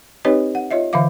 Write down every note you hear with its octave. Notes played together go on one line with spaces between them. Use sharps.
C4 D#4 G4 B4 C#5 D#5
F#5
F4 C#5 D#5 E5
D3 E3 E5 F5 D6